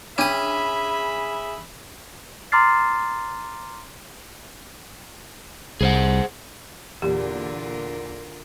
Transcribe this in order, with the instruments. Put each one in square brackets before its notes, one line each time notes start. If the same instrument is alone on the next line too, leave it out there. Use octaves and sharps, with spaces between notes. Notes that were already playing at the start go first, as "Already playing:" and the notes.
[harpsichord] C#4 D#6 [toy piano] D4 D6 [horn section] G#4 E5 [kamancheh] B5
[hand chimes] A#5 C6 D6 F6 A6 C7
[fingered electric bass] C2 [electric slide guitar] G#4 C5 F#5
[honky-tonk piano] E2 A#2 [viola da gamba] D3 F4 A#4 [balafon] G4